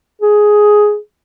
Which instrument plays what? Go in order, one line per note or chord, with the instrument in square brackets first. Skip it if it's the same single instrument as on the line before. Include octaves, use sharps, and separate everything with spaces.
[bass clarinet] G#4